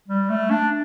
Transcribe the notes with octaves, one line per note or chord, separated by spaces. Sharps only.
G3
A3
D4